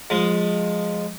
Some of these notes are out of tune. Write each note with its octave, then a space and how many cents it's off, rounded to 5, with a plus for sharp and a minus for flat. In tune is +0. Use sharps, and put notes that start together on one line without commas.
F3 +25 G#3 +0